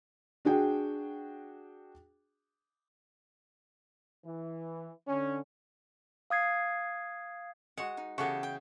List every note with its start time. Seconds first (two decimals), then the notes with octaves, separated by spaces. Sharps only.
0.45 D4 F#4 G#4 G5
4.24 E3
5.08 D3 C#4
6.30 F5 D#6 G#6 C7
7.78 G#3 F#4 F#5
7.97 D#4
8.18 C#3 E3 B3 F#4 G4 A4 C#6
8.43 G5